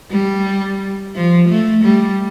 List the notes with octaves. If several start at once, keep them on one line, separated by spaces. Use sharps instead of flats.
G3
F3
A3
G3